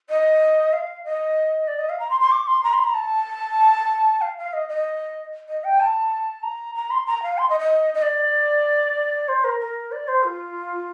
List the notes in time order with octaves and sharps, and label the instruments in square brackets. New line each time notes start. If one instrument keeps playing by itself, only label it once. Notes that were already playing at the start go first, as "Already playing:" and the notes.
[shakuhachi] D#5
F5
D#5
D5
D#5
F5
A#5
C6
C6
D6
C6
A#5
C6
A#5
A5
F5
F5
D#5
D#5
D#5
G5
A5
A#5
A#5
C6
A#5
F5
C6
D#5
D#5
D#5
D5
C5
A#4
A#4
D5
C5
F4